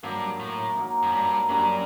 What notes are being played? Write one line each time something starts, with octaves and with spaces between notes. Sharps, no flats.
G2 F#3 A#3 D#4
A2
F#3 A#3 D#4
F#2
G2
F#2 G3 A#3 D4